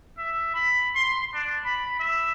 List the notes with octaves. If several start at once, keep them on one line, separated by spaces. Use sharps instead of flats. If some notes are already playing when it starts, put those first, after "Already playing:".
E5
B5
C6
D4
B5
E5